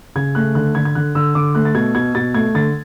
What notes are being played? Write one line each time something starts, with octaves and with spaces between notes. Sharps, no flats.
C#3 G#6
A3 F#6
D3 F#6
D3 G#6
G#6
D3 F#6
D3 E6
D3 D6
A3 F#6
A6
B2 G#6
B2 G#6
B2 A6
A3 G#6
D3 A6